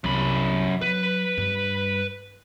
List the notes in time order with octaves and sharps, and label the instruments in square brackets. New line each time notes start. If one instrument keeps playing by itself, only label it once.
[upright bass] C2 [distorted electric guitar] F#2 B5
[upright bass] F#3 [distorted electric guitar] B4
[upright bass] G2